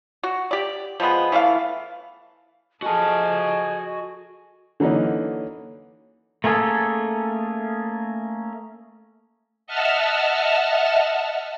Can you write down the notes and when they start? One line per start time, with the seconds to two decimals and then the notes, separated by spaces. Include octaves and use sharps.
0.23 F#4
0.51 G4 D5
1.00 F3 G3 G#3 B3
1.32 E3 A3 E4 F5
2.82 F3 F#4 G#4 A4 D#5 G#5 A5
4.80 D3 E3 F#3 A#3 C#4 D#4
6.44 A3 A#3 C#4 G#4 A4
9.67 D#5 E5 F#5 A5 E6 F6